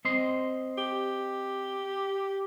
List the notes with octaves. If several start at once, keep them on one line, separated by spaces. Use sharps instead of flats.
C4 D#5 C6
G4